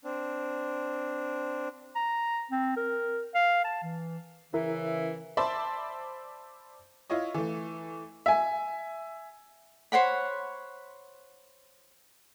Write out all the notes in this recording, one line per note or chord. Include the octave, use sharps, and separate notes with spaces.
C4 D4
A#5
C4
A#4
F5
A5
E3
C#3 E3 E4 A#4 E5
C5 D5 E5 A5 B5 C6
E4 F4 C#5 D#5
E3 A3
E5 G#5
C5 C#5 F#5 B5